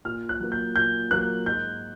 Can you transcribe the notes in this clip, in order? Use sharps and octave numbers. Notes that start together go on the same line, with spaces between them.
A#2 F6
F#6
F#3 A#3
G6
A#2 G6
F#3 A#3 F#6
G#2 G6